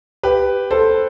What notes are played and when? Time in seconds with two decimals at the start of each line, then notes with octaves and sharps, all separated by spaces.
0.23 G4 B4
0.71 A4 C5